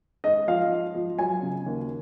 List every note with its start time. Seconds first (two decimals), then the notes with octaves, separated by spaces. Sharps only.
0.24 G#2 D#5
0.48 F3 F5
0.71 G#2
0.95 F3
1.18 F#3 G#5
1.42 C#3
1.66 D#2